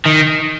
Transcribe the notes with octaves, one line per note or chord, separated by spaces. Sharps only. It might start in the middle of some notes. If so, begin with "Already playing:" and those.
D#3